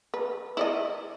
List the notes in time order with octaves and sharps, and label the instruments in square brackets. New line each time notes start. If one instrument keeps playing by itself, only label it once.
[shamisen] B4
E4 D5 D#5